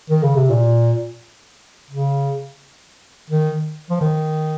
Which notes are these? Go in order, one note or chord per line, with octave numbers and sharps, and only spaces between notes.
D#3
C#3
C3
A#2
C#3
D#3
F3
D#3